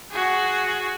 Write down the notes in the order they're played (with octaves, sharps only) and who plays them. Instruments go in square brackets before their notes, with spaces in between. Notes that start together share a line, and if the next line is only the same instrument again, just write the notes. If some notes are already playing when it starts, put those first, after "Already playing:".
[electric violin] F#4 G#4